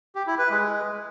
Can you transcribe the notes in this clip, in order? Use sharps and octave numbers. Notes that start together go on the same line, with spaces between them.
G4
E4
B4
G#3